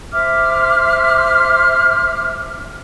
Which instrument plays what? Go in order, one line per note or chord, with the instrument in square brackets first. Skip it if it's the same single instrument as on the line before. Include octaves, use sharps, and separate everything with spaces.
[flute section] C5 E5 D6 F6